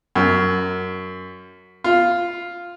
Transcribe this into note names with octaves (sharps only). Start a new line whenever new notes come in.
F#2
F4